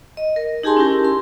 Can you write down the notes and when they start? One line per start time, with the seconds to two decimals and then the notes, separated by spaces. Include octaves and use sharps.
0.17 D#5
0.36 A#4
0.63 D#4 G4 G#4 G#5 A5 C6
0.77 C#4 E4 G4 A#4
1.05 C6